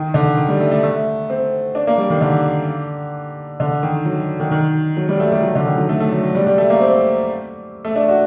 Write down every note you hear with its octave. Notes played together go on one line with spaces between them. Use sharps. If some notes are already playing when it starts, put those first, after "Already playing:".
Already playing: D#3
D3
D#3
G3
A3
A3
A3
C4
D4
A#3
G3
D#3
D3
D3
D#3
F#3
D#3
D#3
F#3
G3
A3
G3
F#3
D3
D#3
F#3
A3
A3
F#3
F#3
G3
G3
A3
A#3
C4
A3
D4
F#4